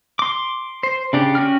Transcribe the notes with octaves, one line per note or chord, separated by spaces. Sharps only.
C6 D6
C5
C#3 D4 G4
C#4 F#4 G5 F6